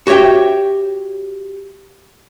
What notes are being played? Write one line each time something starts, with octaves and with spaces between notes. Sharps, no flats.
F#4 G4 C#5 E5 G5